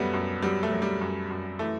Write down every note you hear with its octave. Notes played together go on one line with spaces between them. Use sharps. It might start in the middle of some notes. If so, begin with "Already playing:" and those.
Already playing: F#2 F#3 G3 A3 B3
F#2
F#3 G3
A3
F#3
G3
F#2
F#2
E3 A3